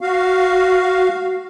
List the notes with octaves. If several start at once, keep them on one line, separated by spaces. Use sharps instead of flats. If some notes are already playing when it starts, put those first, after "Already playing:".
F#4 F5